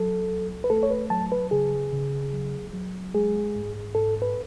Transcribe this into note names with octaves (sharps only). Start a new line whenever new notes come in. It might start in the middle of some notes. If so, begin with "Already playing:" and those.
Already playing: F#3 A4
C#2
B4
A3 A4
C#5
B4
F#3 A5
B4
C#3 G#4
C#3
F#3
F#3
G#3 G#4
G#2
G#2 A4
B4